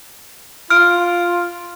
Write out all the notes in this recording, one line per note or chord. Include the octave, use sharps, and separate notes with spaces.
F4 F6 D7